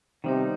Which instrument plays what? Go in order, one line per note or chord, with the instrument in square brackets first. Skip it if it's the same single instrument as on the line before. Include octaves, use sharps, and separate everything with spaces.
[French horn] C3 [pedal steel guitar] D#3 G3 B3 D#4